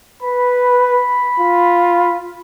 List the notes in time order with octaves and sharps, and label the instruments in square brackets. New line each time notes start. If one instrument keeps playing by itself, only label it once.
[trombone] B4 [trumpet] B5
[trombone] F4